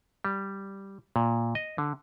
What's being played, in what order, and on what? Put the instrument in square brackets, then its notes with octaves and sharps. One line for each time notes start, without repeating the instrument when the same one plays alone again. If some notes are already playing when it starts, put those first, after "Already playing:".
[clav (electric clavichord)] G3
A#2
D#5
D3